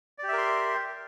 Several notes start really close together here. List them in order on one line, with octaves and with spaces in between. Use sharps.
D5 G4 E5 A#4 C6